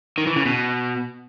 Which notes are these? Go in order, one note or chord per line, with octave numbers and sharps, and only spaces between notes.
D#3
E3
C#3
B2